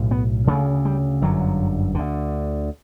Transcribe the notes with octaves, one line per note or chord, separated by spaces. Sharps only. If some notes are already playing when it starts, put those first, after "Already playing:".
Already playing: B1 A2
B3
D2 C#3 A3
G3
G1 F#2 D3 F#3
D2 D3